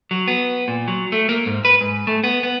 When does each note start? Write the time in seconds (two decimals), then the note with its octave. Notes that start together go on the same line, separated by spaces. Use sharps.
0.11 F#3
0.28 B3
0.68 A#2
0.88 F#3
1.12 A3
1.29 A#3
1.46 G#2
1.65 B4
1.81 G#2
2.07 A3
2.24 B3
2.43 B3